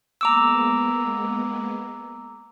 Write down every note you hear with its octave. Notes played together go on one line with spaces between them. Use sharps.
G#3 A#3 B3 A#5 D6 E6